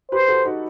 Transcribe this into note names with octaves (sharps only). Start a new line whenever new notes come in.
G4 B4 C5
F#4 A4
D#4 F#4